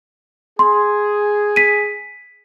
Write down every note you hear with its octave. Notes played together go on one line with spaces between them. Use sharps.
G#4 C6
B6 D#7